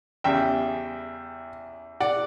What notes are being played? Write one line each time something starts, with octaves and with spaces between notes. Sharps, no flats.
E2 C#3 G3 E5 G5
D5 F#5